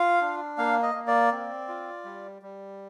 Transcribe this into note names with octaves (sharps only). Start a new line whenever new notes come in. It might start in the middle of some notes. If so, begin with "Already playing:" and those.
Already playing: F4 F5
D4
A#3 F5
D#5
A#3
D5
C4
F4
G3
G3